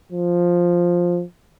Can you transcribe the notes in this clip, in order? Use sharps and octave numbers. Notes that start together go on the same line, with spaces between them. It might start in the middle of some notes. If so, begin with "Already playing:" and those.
F3